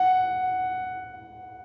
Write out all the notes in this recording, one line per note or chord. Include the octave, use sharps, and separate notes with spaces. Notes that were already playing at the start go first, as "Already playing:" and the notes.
Already playing: F#5